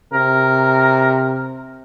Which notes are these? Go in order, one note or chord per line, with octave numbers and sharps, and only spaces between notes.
C3 A#4